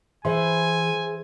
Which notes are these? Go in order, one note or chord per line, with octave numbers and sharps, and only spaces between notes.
E3 G#4 C5 E5 G#5 C6